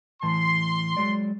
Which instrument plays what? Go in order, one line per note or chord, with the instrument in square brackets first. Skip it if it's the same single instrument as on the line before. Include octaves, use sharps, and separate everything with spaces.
[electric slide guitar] A2 E3 A5 [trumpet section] C6
[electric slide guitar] F#3 G#3 D5